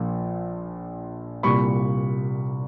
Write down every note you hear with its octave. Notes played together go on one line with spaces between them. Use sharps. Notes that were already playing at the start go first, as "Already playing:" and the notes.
Already playing: A#1 A#2 F3
C2 A#2 G3 B5 C#6